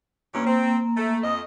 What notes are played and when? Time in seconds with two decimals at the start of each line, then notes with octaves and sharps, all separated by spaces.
0.35 G2 E3 A#3 C#4 A#5
0.47 C4
0.97 A3
1.24 F2 D#5